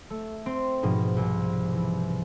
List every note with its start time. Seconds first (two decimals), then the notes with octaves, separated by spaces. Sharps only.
0.10 A3
0.46 C4
0.83 G#2 B2 F3 G#4
1.17 C2
1.73 E3